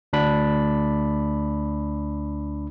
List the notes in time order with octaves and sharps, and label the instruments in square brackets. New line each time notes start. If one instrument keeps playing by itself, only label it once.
[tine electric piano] D2 D4 B5